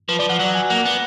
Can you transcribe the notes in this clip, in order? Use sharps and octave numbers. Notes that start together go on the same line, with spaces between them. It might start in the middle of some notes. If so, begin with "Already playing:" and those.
F3 B4
F3 D5
F3 F#5
F#3 F#5
G#5
A#3 F#5
B3